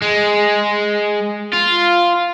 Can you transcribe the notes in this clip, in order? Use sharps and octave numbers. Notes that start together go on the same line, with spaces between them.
G#3
F4